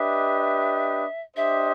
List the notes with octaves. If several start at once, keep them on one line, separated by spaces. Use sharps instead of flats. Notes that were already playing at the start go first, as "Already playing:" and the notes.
Already playing: D4 G4 B4 D#5 E5
D4 G4 C5 D#5 E5